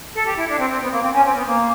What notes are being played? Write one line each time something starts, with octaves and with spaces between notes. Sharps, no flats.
A4
G4
E4
D4
C4
C4
B3
A#3
C4
C#4
C4
B3
A#3